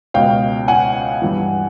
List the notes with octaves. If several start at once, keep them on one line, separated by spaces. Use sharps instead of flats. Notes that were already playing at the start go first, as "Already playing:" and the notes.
C#2 B2 F5 G5
F#5 G#5
G2 E3